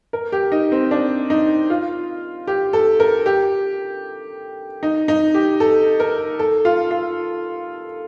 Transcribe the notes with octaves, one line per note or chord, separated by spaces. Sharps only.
A#4
G4
D#4
C4
D4
D#4
F4
G4
A4
A#4
G4
D#4
D#4
G4
A4
A#4
A4
F4
F4